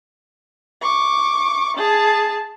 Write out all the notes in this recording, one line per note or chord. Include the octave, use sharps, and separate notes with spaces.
C#6 D6
G#4 A5